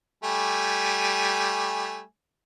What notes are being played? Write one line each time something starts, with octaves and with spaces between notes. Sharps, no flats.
G3 A3 G#5